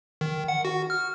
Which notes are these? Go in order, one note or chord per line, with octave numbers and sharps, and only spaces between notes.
D#3
F#5
F#4
F6